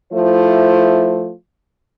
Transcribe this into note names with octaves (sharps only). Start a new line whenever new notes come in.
F3 A3 E4 C5